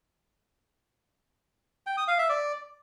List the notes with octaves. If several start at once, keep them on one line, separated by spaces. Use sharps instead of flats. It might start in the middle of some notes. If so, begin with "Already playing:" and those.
G5
D#6
F5
E5
D5